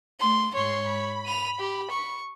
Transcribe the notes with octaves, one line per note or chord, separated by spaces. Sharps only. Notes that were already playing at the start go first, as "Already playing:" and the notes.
A3 C6
G#2 C#5 C6
B5
D#7 F7
G4
C#6